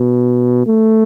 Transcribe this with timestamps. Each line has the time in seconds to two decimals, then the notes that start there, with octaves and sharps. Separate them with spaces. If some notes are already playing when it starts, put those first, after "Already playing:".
Already playing: B2
0.67 A3